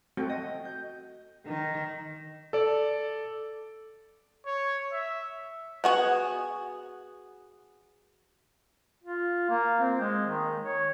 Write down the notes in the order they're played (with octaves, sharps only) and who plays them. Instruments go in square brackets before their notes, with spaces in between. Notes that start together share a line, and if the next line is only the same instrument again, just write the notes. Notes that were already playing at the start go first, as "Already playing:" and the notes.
[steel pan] A3 C4 F#4 [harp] G5
[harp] D#5
G6
[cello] D#3
[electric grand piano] A4 D5
[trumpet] C#5
E5
[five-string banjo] B3 F#4 G#4
[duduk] F4
A#3
C4
G#3
D#3
C#5